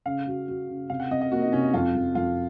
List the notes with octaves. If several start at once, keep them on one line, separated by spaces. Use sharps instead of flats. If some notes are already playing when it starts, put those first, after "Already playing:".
C#3 F5
F#4
F#4
C#3
C3 F5
F#5
C3 D#5
D#5
A#3 F#4
D#4
C3 C#4
D#4
F2 F4
F2
F2 F4